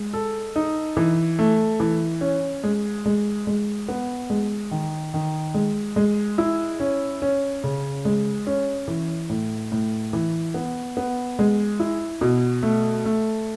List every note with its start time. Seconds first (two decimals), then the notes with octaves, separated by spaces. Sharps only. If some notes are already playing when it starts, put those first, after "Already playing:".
Already playing: G#3
0.14 A4
0.56 D#4
0.97 E3
1.39 A3
1.80 E3
2.21 C#4
2.64 G#3
3.06 G#3
3.47 G#3
3.88 B3
4.30 G#3
4.71 D#3
5.14 D#3
5.54 G#3
5.96 G#3
6.38 E4
6.80 C#4
7.22 C#4
7.64 C#3
8.05 G#3
8.47 C#4
8.88 E3
9.29 A2
9.72 A2
10.13 E3
10.54 B3
10.97 B3
11.39 G#3
11.80 E4
12.21 B2
12.63 A3
13.05 A3